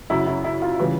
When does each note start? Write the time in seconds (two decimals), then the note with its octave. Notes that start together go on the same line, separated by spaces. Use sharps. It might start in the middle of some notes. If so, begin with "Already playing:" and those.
0.10 F#2 C#3 F#3 E4
0.27 E4
0.44 E4
0.62 F4
0.79 C#3 E3 G3